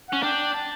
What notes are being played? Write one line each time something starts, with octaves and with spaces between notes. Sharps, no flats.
C#4 F#5
D4 G5
A5